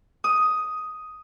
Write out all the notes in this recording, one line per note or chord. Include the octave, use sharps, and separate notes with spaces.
D#6